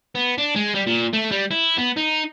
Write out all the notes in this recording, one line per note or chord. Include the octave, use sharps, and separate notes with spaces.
B3
D4
G#3
G3
A#2
A3
G3
E4
B3
D#4